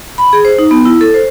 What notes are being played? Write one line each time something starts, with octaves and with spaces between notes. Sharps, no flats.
B5
G#4
C5
D#4
B3
E4
A4
C5